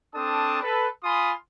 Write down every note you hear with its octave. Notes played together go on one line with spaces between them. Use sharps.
C4 D4 A4 A5 D#6
A4 B4
F4 G#5 B5 C6 D#6